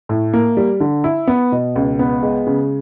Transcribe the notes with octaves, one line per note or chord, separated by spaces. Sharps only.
A2
A#3
G3
D3
E4
B3
B2
C#2
B3
G#3
C#3